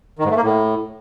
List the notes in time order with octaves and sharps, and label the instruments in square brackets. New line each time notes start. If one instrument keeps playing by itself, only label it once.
[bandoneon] D#3
G#2
A3
A#3
A2